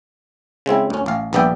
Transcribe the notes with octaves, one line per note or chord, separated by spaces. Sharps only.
C#3 G#3 C4 E4
D2 C#4
A1 F5
A#1 G2 B3 D5 E5 G5